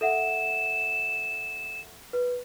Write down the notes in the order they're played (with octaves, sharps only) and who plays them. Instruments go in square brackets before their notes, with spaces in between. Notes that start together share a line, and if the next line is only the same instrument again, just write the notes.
[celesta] A4 E5 F#5 [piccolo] E7
[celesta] B4